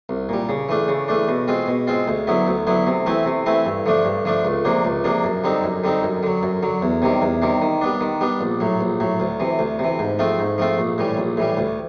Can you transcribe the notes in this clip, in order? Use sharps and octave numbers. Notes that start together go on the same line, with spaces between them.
C2
A#2 G3
C#3
E3 A3 D4
C#3
E3 A3 D4
B2
G#3 C4 F4
B2
G#3 C4 F4
D2
D3 F#3 B3 E4
D2
D3 F#3 B3 E4
C3
E3 A3 C4 E4
C3
E3 A3 C4 E4
G2
D3 F3 A3 D4
G2
D3 F3 A3 D4
C#2
C3 F3 A#3 D4
C#2
C3 F3 A#3 D4
F#2
D3 G3 C4 D#4
F#2
D3 G3 C4 D#4
F#2
D3 F#3
F#2
D3 F#3
E2
C3 D#3 G3
E2
C3 D#3 G3
D#3
G3 B3 D4
D#3
G3 B3 D4
A#1
A2 F#3
A#1
A2 F#3
D2
C3 E3
D2
C3 E3
G#2
F3 A3 C4 F4
G#2
F3 A3 C4 F4
A#1
A2 E3 G3
A#1
A2 E3 G3
D2